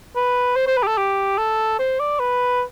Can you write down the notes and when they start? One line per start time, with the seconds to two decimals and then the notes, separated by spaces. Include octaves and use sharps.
0.16 B4
0.56 C5
0.67 C5
0.77 B4
0.83 G4
0.87 A4
0.97 G4
1.38 A4
1.79 C5
1.99 D5
2.19 B4